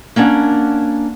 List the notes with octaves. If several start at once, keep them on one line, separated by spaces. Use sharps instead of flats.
A#3 C#4 D4 F#5